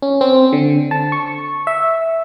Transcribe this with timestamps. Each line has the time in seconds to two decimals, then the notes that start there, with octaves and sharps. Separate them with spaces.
0.02 C#4
0.21 C4
0.53 D3
0.91 A5
1.12 C#6
1.67 E5